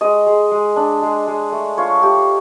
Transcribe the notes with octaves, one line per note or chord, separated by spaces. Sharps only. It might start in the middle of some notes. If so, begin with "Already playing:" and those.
G#3 D#5
G#3
G#3
D4
G#3
G#3
A3
F4 C#5
A3 G4